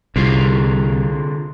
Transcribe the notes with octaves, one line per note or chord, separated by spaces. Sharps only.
C2 D3 F4 G#4